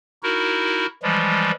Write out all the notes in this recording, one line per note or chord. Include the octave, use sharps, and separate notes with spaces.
D#4 E4 F#4 A#4
E3 F3 G3 G#3